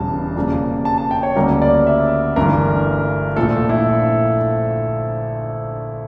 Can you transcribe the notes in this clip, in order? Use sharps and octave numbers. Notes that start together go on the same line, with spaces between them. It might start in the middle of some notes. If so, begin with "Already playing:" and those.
Already playing: E1 E2 C#3 G3 A5
F2 C#3 G3 A#3
A5
A5
G5
C#5
D2 C#3 G3 A#3 A#4
D5
E5
G1 G2 E3 A3 A#4
A#1 A#2 F3 A3 A4
E4